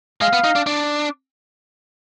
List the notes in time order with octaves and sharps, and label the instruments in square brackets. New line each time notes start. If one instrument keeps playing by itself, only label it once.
[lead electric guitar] G#3 [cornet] F5
[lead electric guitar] B3
D#4
D4
D4